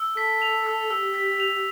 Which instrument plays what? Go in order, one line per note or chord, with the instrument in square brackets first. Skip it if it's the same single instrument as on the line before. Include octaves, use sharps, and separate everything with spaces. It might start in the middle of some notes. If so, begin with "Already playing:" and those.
Already playing: [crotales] E6
[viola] A4 [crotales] B6
[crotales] F7
E6
[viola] G4 [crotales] E6
[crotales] B6
F7